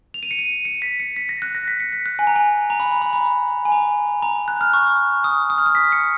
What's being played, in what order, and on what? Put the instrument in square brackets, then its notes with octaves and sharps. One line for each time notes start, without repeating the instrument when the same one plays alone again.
[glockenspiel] F7
D#7
C#7
D#7
C#7
B6
C#7
B6
A#6
F#6
A#6
B6
C#7
B6
F#6
G#5
A#5
G#5
A#5
B5
A#5
B5
A#5
G#5
A#5
A#5
F#6
F6
C#6
D#6
D#6
F6
D#6
B6
C#7